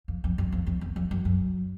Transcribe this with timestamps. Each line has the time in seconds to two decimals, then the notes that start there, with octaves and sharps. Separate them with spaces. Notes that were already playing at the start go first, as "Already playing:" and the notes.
0.08 F2
0.24 F2
0.38 F#2
0.52 F2
0.67 F2
0.81 E2
0.96 F2
1.11 F#2
1.25 F#2